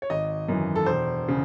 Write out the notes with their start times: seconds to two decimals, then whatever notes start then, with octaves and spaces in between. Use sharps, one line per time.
0.02 C#5
0.10 G#1 D#5
0.49 F#2 E3
0.76 A4
0.86 E1 C5
1.28 C#3